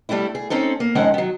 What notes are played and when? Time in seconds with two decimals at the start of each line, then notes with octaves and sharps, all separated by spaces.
0.09 G3 A3 C#4 D4 E4
0.35 G#4
0.50 C4 C#4 D#4 A4
0.80 A#3
0.95 F2 D#3 G#3 C#4 F#5
1.14 D#3 F#3